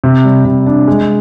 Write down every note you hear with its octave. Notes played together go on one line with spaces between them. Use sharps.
C3
G3
C3
D4
G#3